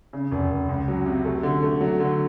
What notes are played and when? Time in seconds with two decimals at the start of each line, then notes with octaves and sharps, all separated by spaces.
0.13 C#3
0.31 F1
0.50 F1
0.69 C#2
0.88 F#3
1.06 C3
1.25 A3
1.43 D3
1.63 A3
1.81 F#3
2.00 D3